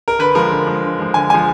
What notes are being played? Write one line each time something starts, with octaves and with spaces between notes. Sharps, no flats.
A#4
D3 B4
F3 G#3 A#4
D3
F3 G#3
D3
F3 G#3
D3 G#5
F3 G#3 G#5